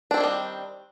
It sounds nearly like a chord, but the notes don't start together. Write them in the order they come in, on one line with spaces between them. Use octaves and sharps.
D4 C4 A#3 D#3 G3